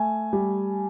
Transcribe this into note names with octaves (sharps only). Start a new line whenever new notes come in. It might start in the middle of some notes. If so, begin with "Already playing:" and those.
Already playing: A3 G#5
G3